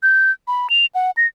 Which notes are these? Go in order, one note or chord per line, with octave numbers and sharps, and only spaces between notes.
G6
B5
F7
F#5
A#6